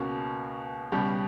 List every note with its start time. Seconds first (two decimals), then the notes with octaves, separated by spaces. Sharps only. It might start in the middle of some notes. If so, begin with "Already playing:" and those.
Already playing: C#2 B2 A#3 C#4 F#4
0.92 C#2 B2 G3 C#4 G4